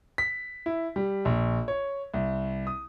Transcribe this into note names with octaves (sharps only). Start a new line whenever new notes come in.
B6
E4
G3
A#1
C#5
C2
D#6